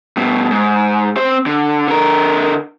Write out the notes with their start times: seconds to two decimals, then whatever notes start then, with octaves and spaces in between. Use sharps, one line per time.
0.17 G2 B2
0.51 G#2
1.17 C4 C5
1.46 D3
1.88 D3 A#4